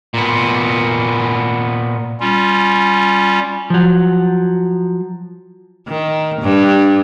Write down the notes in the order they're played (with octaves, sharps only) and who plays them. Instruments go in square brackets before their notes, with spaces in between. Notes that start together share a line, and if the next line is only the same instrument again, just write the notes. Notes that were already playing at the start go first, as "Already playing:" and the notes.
[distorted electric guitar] A#2 B3
[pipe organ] G3 C#4 F4
[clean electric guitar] F3 F#3
[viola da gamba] D#3
G2